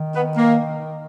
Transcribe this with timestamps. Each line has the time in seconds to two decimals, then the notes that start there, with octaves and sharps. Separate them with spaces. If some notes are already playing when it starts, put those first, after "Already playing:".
Already playing: D#3
0.15 B3
0.37 A#3